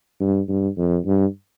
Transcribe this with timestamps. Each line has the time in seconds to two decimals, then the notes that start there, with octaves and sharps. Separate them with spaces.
0.20 G2
0.49 G2
0.77 F2
1.06 G2